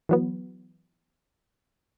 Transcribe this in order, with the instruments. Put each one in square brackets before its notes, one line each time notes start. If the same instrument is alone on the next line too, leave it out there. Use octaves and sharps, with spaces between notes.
[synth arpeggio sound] E3 F#3 B3